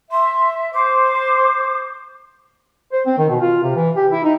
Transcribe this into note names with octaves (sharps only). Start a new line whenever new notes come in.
E5 C6
C5 D6
C5
C4
D#3
B2
F4
C3
E3
G4
E4
D#4